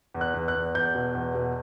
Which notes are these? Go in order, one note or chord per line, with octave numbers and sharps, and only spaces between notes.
E2
F#6
E2
F#6
E2
E2 G6
B2
E2
B2